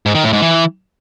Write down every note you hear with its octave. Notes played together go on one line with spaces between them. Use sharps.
G#2
D#3
A2
G#2
E3